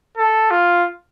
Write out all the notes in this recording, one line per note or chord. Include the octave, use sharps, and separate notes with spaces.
A4
F4